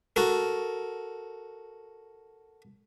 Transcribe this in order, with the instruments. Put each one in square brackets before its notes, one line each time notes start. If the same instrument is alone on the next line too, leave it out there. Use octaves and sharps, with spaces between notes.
[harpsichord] F#4 A4 A#4